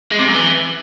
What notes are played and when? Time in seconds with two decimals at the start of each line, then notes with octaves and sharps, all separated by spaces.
0.12 G#3
0.19 C3
0.27 F#2
0.34 E3